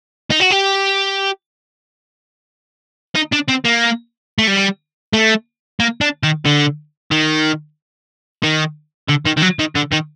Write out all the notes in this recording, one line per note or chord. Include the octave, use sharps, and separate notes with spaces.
D#4
F#4
G4
D#4
D4
C4
A#3
A3
G3
A3
A#3
D4
D#3
D3
D#3
D#3
D3
D#3
D#3
F#3
D#3
D3
D#3